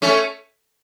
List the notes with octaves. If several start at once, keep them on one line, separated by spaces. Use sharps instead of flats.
A3 C#4